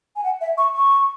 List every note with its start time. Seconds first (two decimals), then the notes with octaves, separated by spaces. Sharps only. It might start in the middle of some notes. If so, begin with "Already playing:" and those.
0.16 G#5
0.24 F#5
0.41 E5
0.58 C#6
0.74 C#6